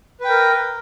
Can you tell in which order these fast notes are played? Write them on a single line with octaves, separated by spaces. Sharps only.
B4 G5 A#4